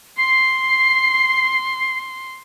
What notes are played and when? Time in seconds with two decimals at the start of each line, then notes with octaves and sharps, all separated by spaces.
0.18 C6 C7